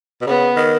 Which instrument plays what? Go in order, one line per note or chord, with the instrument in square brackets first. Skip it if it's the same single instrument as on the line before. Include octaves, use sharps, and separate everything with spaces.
[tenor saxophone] B2
[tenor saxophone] C#3 [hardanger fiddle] B3
[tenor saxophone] D#3